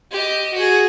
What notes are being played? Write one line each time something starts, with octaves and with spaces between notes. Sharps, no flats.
G4 D#5
F#4 G#4